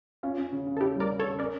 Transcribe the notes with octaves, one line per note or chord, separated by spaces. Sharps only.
C#4 F4
C#4
C#3
C#3
A4
C#3 E4 G4
G3 A#4 D5
C#3
A4 C#5
C#3
C#4 A#4 D5